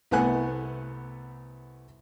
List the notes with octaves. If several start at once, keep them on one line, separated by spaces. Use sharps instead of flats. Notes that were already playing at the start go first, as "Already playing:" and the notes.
C2 A3 B3 F#5 G#5 F#6